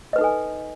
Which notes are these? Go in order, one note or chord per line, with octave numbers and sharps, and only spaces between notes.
D#4 A4 B4 D#5 G#5